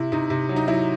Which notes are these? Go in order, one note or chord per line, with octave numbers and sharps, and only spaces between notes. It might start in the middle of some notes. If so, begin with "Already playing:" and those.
Already playing: C3 E4
C3 D#4
C3
F#3
D#4
F#3 E4